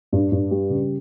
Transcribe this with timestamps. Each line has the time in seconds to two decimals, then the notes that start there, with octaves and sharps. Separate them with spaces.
0.13 G2
0.32 G2
0.51 G3
0.70 C#3